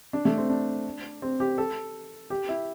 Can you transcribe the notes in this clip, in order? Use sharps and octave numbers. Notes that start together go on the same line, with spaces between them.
D4
A3
C4
D4
C4
G4
A4
G4
E4